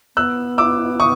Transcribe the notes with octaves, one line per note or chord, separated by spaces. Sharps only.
B3 E6 F#6
D6 E6
C#6 D#6